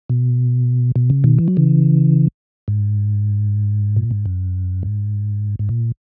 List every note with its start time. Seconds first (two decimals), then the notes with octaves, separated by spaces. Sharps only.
0.10 B2
0.96 B2
1.10 C#3
1.24 B2 D#3
1.39 E3
1.48 F#3
1.57 C#3 E3
2.68 G#2
3.96 A#2
4.11 G#2
4.26 F#2
4.83 G#2
5.59 G#2
5.69 A#2